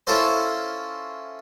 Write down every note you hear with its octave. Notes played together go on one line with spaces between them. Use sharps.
C#4 E4 F4 A4 C5